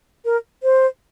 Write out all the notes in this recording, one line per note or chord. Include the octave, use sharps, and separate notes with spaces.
A#4
C5